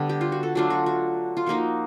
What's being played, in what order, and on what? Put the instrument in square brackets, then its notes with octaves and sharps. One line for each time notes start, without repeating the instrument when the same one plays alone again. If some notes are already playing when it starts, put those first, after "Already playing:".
Already playing: [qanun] D3 G3 B3
G4
F4
F#4
A4
F#3 A3 D4 F4
F#4
F#4
F4
F3 A#3 D#4 F#4